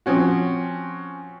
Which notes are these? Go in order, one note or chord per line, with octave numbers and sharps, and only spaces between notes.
F3 C4 C#4 F#4